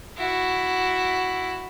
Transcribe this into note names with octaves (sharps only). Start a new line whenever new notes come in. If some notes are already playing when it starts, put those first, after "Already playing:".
E4 F#4